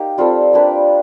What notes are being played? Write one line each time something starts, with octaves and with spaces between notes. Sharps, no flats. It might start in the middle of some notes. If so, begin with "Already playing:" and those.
Already playing: A#3 D#4 G4
G3 C4 F4 A4
A#3 D4 G4 B4